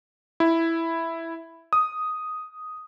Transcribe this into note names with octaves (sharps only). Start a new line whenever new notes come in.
E4
D#6